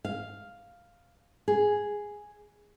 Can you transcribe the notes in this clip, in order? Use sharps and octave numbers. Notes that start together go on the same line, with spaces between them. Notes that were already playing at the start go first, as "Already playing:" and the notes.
F5
G#4